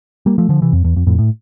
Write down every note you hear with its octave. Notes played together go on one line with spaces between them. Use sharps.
G3 A#3
F3 A3
D3 F3
C3 E3
F2
E2
F2
F2 A2
A2